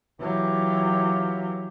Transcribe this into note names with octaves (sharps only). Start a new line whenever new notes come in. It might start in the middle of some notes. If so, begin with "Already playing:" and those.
E3 F#3 F4 G4